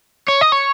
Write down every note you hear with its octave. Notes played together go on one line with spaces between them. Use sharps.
C#5
D#5
C#5